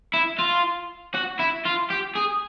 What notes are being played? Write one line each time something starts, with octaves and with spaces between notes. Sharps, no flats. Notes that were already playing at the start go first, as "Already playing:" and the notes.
E4
F4
F#4
E4
F4
G4
G#4